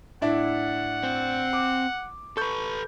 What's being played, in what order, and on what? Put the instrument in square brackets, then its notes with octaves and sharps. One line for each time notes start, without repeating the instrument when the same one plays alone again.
[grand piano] A2 D4 E4 [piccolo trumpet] F#5
[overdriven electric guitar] C4
[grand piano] D6
[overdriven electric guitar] A4 B4 [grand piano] C#6 G6